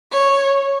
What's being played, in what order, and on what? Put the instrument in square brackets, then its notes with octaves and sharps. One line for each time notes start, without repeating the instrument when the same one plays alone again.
[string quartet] C#5